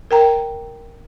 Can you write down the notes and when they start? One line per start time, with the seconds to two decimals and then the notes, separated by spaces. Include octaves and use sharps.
0.11 A#4 G5 A#5